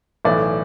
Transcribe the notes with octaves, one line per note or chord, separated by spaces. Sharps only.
B1 A2 E3 D5